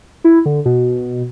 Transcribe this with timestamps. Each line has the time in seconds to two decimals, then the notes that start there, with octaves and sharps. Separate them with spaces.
0.24 E4
0.46 D3
0.65 B2